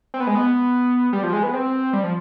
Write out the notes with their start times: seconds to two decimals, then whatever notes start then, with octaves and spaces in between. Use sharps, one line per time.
0.14 C4
0.20 B3
0.27 G#3
0.35 B3
1.13 G3
1.23 F3
1.33 G#3
1.43 B3
1.54 C4
1.93 G3
2.04 F3